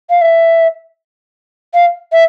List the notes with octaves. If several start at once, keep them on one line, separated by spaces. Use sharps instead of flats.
F5
E5
F5
E5